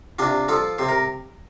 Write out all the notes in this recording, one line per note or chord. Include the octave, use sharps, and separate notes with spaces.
C3 D4 F4
F3 F4 A4
C3 C5
A#4